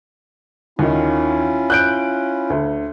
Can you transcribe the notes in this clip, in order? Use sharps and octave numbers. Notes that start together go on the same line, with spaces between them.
D#2 D#3 C#4 E4 F4
F#6 G6 D7
D2